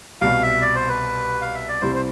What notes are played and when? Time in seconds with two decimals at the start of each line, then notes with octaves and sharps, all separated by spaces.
0.21 C2 B2 G3 F5
0.42 E5
0.62 D5
0.75 C5
0.89 B4
1.42 F5
1.55 E5
1.69 D5
1.81 C2 C3 G3 C4 E4 C5
1.95 C5